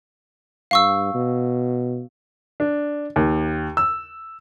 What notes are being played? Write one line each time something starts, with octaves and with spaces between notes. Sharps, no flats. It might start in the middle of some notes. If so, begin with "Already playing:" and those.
G2 F5 C#6 E6
B2
D4
D#2
E6